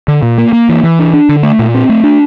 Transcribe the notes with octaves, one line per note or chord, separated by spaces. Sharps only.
D3
A#2
A#3
A#3
E3
E3
D4
D4
D3
A3
A#2
C4
A3
D4